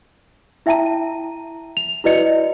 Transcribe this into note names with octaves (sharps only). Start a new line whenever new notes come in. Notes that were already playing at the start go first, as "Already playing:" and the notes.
E4 E5 G5 A5 A#5 D#7
F7
E4 F#4 B4 D5 D#5 C#7